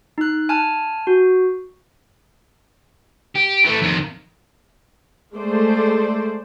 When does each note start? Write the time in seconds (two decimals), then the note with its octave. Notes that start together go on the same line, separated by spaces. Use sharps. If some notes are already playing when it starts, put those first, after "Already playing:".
0.18 D#4 F#6
0.49 G#5 A5 F6
1.07 F#4
3.36 G4
3.65 E3 A3
3.82 F2 D#3
5.35 G#3 A3 C5 D5